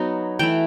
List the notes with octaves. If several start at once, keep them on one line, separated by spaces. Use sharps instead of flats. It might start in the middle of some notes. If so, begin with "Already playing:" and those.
Already playing: F#3 B3 D#4
E3 A3 E4 G5